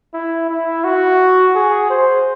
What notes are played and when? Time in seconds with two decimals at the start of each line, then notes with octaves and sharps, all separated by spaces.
0.14 E4
0.49 E4
0.84 F#4
1.55 G#4
1.90 C5